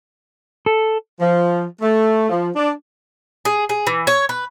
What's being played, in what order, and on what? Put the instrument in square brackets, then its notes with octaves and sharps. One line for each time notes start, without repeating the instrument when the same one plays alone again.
[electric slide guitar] A4
[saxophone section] F3
A3
F3
D4
[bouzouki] G#4
G#4
E3
C#5
B4